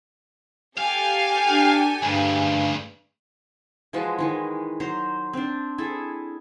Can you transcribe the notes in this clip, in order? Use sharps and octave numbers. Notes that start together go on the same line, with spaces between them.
G4 A4 F5 G#5
D4
D2 G2 C#3
E3 F3 G#3 F#4
D#3 E3 G#3
F#3 C5 A#5 C6
C4 D4
E4 G#4 A4 E5